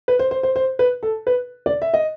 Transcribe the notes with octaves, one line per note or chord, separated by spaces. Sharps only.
B4
C5
C5
C5
C5
B4
A4
B4
D5
E5
D#5